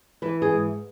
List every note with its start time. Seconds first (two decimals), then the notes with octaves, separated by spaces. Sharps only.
0.22 E3 B4
0.42 G#4
0.52 G#2